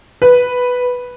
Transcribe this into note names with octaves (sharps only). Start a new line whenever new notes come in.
B4